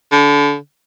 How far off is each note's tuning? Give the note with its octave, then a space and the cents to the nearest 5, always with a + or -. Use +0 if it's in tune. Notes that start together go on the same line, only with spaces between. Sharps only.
D3 -30